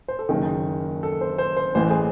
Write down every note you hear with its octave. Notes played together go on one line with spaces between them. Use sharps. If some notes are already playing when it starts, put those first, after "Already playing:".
C5
A4
F#1 F#2 D#3 G#4
A4
C5
C5
C5
A1 A2 E3 C5
G#4